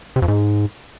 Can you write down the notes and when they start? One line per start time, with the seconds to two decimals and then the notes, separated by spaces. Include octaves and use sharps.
0.16 C3
0.22 F2
0.28 G#2